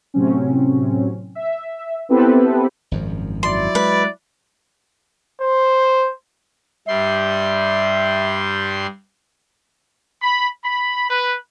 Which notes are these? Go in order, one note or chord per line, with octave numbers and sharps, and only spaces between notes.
A2 C3 F#3 C4 C#4
E5
B3 C4 E4 G4 A4 B4
G#1 F#2 F3
F#3 E4 D5 C6
G#3 B4
C5
G2 G3 E5 C6
B5
B5
B4